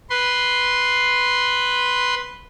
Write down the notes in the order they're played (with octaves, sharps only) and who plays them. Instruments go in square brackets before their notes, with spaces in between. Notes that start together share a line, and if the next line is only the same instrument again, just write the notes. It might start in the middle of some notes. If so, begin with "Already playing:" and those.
[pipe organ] B4 C6